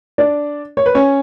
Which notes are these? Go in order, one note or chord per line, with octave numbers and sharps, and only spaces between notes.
D4 D5
C#5
B4
C#4 C#5